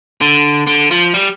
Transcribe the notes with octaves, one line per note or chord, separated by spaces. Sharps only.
D3
D3
F3
G3